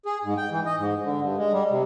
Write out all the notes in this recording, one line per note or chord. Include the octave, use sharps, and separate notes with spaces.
G#4
G#2
G5
E3
D#5
G#2
D3
G2
G#3
G3
C3